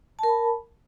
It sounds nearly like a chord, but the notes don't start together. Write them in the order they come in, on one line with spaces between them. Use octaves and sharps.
A5 A#4 B5